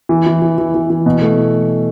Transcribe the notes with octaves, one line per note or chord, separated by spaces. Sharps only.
E3
E3
E3
E3
E3
E3
B2
A3